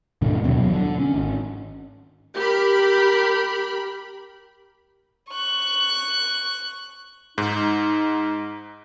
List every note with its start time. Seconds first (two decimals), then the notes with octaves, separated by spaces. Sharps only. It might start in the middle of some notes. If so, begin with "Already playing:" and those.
0.22 D#2 G#2 B2 D3
0.44 D#2 B2 F#3
0.62 G1 E2 F#3
0.74 D3
0.99 C#4
1.14 G#1
2.35 G4 A#4 B5
5.31 C#6 F#6
7.38 G#2 D#4